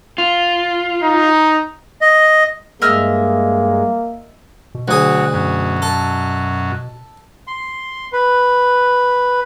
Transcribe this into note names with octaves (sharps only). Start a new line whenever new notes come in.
F4
D#4
D#5
G2 G#3 A#3 D#5 E5 F6
B2
D2 F#3 G#4
F#2
A4
C6
B4